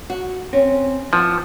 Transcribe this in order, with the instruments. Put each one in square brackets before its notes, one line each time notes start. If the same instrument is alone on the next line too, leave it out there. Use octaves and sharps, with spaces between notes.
[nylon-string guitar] F#4
[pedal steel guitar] C4 [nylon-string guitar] C#4
[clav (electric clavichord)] F3 [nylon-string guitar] E4 [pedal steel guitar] B4 F#5 D6